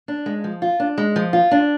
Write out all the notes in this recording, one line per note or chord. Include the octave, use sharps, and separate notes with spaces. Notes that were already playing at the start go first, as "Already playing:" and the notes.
D4
G#3
F3
F4
D4
G#3
F3
F4
D4